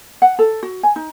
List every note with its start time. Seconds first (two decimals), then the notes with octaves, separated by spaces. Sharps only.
0.22 F#5
0.39 A4
0.63 F#4
0.83 G#5
0.96 D#4